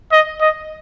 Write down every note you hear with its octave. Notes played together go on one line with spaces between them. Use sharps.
D#5
D#5